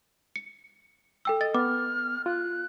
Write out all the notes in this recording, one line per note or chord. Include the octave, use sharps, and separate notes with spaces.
C#7
A4 G5 E6
D#5 A6
B3 D6 F6
F4 F#6